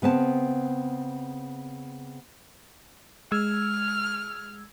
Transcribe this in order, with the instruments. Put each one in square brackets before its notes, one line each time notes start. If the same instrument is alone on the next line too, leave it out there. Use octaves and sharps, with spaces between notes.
[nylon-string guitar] C#3 B3 C4 A5
[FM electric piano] G#3 E6 G#6 [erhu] F6